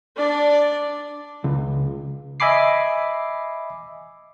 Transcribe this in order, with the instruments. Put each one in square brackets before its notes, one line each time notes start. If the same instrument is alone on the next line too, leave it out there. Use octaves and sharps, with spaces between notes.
[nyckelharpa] D4 D5
[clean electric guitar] C#2
[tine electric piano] D#5 E5 G#5 B5 D6 C7